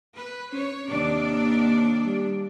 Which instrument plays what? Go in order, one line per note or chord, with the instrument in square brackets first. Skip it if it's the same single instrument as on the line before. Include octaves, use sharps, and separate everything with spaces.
[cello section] B4
[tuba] C#4 [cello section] C#5
[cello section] D#2 D4 D5 [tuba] C3
[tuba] G3